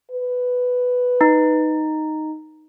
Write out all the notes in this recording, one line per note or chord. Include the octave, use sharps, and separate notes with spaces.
B4
D#4